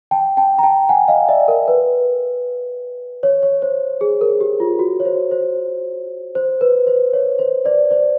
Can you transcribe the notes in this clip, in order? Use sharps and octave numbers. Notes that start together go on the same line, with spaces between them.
G5 A5
G5 A5
A#5
G5 A5
F#5 G#5
D#5 F5
D5 E5
A#4
B4
C#5
C#5
C5
G#4
A#4
G4
F4
F#4
C#5
C5
C5
C5
B4
C5
C#5
C5
C5 D5
C5 D5